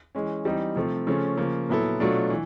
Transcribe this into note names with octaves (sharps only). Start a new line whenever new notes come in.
E3 G#3 C#4
E3 G3 C4 D#4
C3 F3 A3
C#3 F3 A3 C#4
C#3 F3 A#3
A#2 F#3 B3 E4 A4
B2 F#3 A3 D4 F4
E3